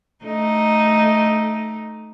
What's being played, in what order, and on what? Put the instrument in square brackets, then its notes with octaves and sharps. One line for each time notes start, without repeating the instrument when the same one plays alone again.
[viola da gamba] A3 D#4